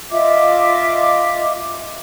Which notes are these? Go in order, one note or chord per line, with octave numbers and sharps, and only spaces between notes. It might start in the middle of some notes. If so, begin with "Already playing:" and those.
F4 D#5 E5 D6